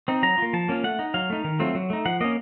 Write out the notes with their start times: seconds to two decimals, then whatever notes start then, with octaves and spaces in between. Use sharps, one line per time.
0.08 C4 D#4
0.23 F#3 A#5
0.38 A#3 F4
0.53 F3 A5
0.69 A#3 C#4 F4
0.84 A3 F#5
0.99 D#4
1.14 F#3 F5
1.30 A3 D#4
1.44 D#3
1.60 F#3 A3 C4 F4
1.75 F#3
1.90 A3 D#4
2.05 F3 F#5
2.20 A#3 C#4 D#5